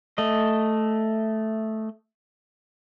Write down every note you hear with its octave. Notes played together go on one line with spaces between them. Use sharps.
A3 D#5